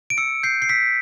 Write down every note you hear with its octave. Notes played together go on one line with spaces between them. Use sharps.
D7
E6 C#7
G6 C7
C7
E6 B6